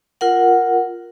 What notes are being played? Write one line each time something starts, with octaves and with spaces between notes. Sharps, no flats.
F4 A#4 F#5